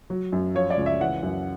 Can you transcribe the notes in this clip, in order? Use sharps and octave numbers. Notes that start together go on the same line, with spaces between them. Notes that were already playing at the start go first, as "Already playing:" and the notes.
F#3
F#2
F3 C#5
D5
C#2
E5
E3 F#5
F#2